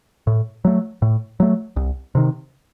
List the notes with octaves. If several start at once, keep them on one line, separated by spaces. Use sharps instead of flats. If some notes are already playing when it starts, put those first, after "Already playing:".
A2
F#3 A3
A2
F#3 A3
C2
C3 D#3